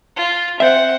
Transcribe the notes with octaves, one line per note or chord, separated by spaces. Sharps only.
F4
C4 C5 E5 F#5